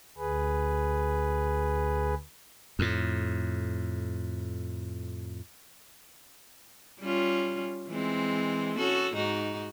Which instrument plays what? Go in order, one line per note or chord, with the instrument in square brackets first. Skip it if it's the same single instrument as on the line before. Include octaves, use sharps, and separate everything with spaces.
[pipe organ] D2 G#4 B4
[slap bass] F2 A2
[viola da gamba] G3 C#4 F4
E3 G#3 C4
C#4 F#4 A4
G#2 D#4 F#4